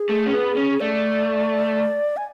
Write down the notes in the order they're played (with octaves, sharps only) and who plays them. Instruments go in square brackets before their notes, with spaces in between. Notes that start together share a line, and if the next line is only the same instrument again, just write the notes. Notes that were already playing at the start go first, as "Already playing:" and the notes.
Already playing: [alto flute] G#4
[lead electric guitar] A3
C#4
B3
C#4
[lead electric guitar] A3 [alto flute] D5
[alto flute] G#5